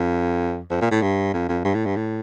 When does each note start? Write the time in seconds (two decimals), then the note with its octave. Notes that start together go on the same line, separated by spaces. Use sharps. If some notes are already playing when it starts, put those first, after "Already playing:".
Already playing: F2
0.71 F2
0.81 A#2
0.91 A2
1.02 G2
1.34 F2
1.49 F2
1.65 G2
1.75 A2
1.86 G2
1.96 A2